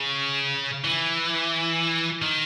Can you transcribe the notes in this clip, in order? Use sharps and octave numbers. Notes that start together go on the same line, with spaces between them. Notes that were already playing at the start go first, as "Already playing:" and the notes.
Already playing: C#3
E3
D#3